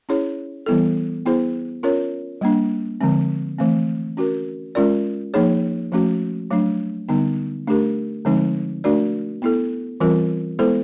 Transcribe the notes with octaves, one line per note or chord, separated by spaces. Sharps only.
C#4 E4 G#4 C#5
E3 G3 B3 E4 A4
B3 E4 G#4 C5
C#4 F4 A#4 C#5
G3 A#3 D4
D3 F3 G#3 C4
E3 A3 C4
C#4 F#4 A#4
G#3 C#4 F4 A#4 D5
F3 A#3 D#4 G#4 C#5
F3 A3 C#4 F#4
F#3 A3 D4
D3 G3 B3 D#4
A3 D4 G4 A#4
D3 F3 G#3 C4 D#4
A3 D4 F#4 A#4 D5
B3 E4 A4
E3 G3 C4 F4 A#4
G#3 B3 E4 A4 C5